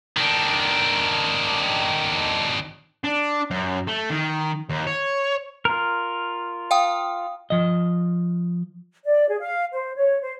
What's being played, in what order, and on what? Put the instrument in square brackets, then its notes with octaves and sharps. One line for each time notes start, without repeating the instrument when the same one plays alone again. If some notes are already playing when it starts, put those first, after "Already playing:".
[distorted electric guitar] D#3 D4
D4
F#2
A3
D#3
D#2
C#5
[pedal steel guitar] F4 A#4
[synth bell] F5 G5 D#6
[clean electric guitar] F3 D#5
[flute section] D5
G#4
F5
C5
C#5
C5